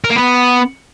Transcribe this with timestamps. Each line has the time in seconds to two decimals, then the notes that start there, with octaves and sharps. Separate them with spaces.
0.04 A#4
0.10 A#3
0.16 B3